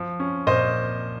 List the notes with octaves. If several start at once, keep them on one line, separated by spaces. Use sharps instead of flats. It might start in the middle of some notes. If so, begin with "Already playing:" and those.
Already playing: F3
C#4
A#2 C5 D#5